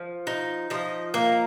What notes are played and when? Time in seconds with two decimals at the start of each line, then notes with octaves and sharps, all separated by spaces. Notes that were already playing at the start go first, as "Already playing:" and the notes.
Already playing: F3
0.27 D#4
0.70 F3 D#5
1.14 A#3